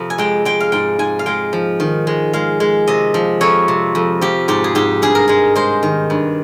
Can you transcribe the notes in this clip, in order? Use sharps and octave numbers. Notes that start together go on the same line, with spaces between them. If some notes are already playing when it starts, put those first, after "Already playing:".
Already playing: F2 C3
G#5
G#3 G5
G#3 G5
F5
G#2 G5
G#2 G#5
F5
G#3 G5
F3
D#3
G#3
G#3 F5
G#3
C3 D#5
F3
F2 C#5
C3
F2
F3 G4
G#2 G4
G#4
G#2 G4
G2 G#4
A#4
G#3 G#4
G#3 C5
D#3
G2